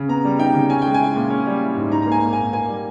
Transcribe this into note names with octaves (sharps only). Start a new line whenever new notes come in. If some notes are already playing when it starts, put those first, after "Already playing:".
Already playing: C#3
B3 A#5
G3
D#4 G5
C#3
C#4 G#5
G#3 G5
G#5
E4
A#2
C#4
G3
E4
G#2
D#4 A#5
A#3 A#5
G#5
A#2
G#5
A#2
A#3 G#5
G3